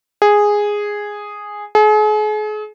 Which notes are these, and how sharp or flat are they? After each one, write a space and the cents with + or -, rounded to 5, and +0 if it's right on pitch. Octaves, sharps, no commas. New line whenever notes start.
G#4 -5
G#4 +40